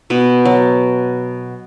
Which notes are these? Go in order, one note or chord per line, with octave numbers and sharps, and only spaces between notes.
B2 B4
F#3